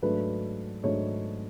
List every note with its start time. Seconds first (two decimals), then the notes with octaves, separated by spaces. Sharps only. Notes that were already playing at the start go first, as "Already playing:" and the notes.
0.02 G#2 F#3 A3 D4 B4
0.83 G#2 F#3 A3 D4 C#5